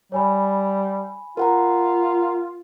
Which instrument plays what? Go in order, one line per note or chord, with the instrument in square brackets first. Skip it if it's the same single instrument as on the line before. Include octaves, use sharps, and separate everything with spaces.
[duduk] G3 [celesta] C#5 G#5 B5
[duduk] F4 [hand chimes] A#4 F#5 A#5